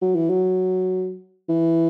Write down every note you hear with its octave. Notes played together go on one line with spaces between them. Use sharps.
F#3
E3
F#3
E3